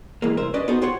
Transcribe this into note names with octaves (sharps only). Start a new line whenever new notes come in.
E3 G#3 A#3
C2 A#4 C5 E5
C#4 D4 B4 D5 D#5
B3 D#4 F#4 A4 C5
F4 G4 C5 C#5 F#5